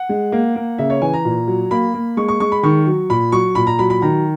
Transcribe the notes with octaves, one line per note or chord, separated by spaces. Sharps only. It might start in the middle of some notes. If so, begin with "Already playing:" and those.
Already playing: F#5
G#3
A#3
A#3
C#3 E5
C#5
E3 G#5
A#5
A#2
F#3
A#3 B5
A#3
G#3 C#6
C#6
G#3 C#6
B5
D#3 C#6
F#3
A#2 B5
F#3 C#6
A#2 B5
A#5
F#3 B5
B5
D#3 A#5